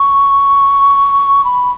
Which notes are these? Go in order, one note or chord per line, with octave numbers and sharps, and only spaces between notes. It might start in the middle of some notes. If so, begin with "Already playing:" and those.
Already playing: C#6
B5